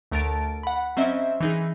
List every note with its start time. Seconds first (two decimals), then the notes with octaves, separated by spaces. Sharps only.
0.11 D2 A3 A#4 A5 A6 D7
0.63 F#5 B5
0.97 F#3 C4 C#4 C5 D#5 E5
1.40 E3 D#4 G#4